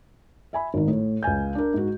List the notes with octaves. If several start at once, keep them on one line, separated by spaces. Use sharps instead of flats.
E5 G#5 B5
G#1 D#3
A2
C#2 F5 G#5 G6
D4 A#4
G#2 F#4